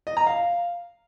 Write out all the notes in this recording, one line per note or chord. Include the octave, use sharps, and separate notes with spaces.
D#5
A#5
F5